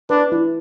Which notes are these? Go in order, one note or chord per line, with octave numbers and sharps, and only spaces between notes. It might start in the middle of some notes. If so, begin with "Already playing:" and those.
D4 B4
E4